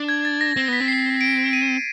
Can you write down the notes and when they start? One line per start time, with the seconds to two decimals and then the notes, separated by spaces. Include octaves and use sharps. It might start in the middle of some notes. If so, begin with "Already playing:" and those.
Already playing: D4
0.09 G#6
0.25 A6
0.41 A#6
0.56 C4 A#6
0.68 B3 B6
0.80 C4
0.88 C7
1.21 D7
1.53 D#7